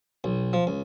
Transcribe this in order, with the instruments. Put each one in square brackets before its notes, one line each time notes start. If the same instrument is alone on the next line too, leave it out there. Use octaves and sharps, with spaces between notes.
[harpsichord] B1
F3
C#2